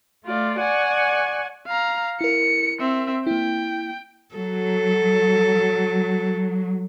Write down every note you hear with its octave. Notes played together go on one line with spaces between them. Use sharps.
A3 F4 D5
D5 F#5 G#5 C#6
F5 A#5
E4 A#4 C#7
C4 E5
A#3 E4 G5
F#3 A4